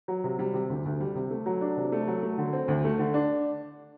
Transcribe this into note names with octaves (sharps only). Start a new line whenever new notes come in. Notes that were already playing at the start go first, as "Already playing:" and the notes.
F#3
C3
G3
C3
D2
D2
G3
C3
A3
F#3
D4
C3
A3
F#3
A3
D3
C4
D2
A3
D3
D4